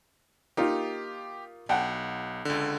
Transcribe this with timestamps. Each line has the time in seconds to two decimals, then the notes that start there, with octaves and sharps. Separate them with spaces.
0.57 A#3 D#4 F4 G4
1.69 B1 F#5 G5 A5
2.45 C#2 D3